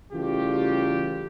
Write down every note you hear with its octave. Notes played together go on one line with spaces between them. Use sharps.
C#3 E3 G3 A3 F4 G4